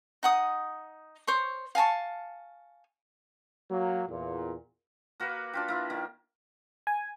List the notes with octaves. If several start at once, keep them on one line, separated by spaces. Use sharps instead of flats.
D#4 F#5 D#6
C5 C#5 C#6
F5 G#5 A5 C#6
F#3 A#3
E2 A#2
A#3 F#4 A#4 B4
D4 F4 G4
A#3 E4 F4
D#3 A#3
G#5